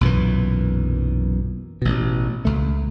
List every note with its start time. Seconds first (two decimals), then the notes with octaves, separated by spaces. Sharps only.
0.01 B1 F#2 A#2 E3
1.82 A1 B2
2.45 C#2 A3